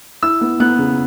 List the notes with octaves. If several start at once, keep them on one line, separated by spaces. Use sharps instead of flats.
E4 E6
B3
B3 F#6
C#3